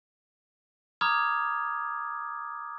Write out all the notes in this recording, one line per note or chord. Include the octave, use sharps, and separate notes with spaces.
A#5 B5 D6 D#6 F6 G#6